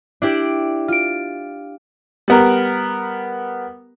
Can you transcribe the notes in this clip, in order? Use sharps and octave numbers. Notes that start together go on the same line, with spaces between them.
D4 E4 G4 D5
F4 D7
G3 B3 A#4